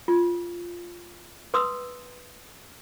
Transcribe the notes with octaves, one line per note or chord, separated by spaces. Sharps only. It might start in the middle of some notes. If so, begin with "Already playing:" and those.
F4
B4 C6 D#6 E6